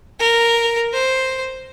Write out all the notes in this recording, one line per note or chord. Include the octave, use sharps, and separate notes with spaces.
A#4
C5